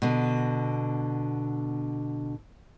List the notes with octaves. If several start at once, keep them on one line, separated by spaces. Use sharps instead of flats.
B2 D3